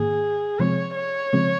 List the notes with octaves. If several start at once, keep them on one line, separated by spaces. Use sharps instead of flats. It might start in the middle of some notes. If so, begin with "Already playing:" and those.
Already playing: G#2 D#3 A#3 G#4
C3 F3 G#3 C4 C#5
C#5
C#3 F3 G#3 C4